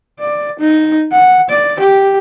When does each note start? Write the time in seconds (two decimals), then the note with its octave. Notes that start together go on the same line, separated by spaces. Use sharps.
0.19 D5
0.59 D#4
1.12 F#5
1.50 D5
1.80 G4